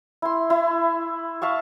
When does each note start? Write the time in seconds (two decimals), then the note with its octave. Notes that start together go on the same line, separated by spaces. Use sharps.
0.22 E4 C6
0.50 E4
1.42 E5 F5 A5 C#6